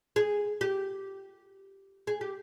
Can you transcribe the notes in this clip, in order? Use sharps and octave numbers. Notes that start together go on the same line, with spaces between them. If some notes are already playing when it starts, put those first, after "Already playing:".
G#4
G4
G#4
G4